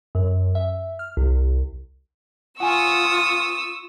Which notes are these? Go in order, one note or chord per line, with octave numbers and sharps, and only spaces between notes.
F#2
E5
F6
C2
F4 F#5 G#5 C#6 D#6 E6